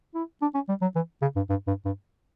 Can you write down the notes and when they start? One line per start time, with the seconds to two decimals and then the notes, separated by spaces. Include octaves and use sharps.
0.15 E4
0.42 D4
0.55 C#4
0.69 G3
0.82 F#3
0.95 E3
1.22 C#3
1.36 G2
1.50 G2
1.67 G2
1.85 G2